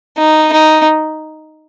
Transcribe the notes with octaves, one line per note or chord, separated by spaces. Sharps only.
D#4
D#4